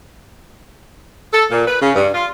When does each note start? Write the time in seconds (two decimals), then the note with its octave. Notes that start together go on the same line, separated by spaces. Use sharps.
1.33 A4
1.51 A#2
1.67 B4
1.81 C#3
1.95 G2
2.13 F4